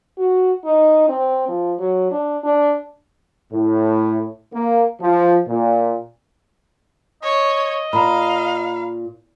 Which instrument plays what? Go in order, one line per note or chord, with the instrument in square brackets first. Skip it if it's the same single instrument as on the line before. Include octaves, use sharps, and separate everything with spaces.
[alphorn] F#4
D#4
C4
F3
F#3
D4
D4
[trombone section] A2
A#3
F3
A#2
[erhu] C#5 [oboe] D#5
[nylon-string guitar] A#2 [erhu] F5 [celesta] A#5 B5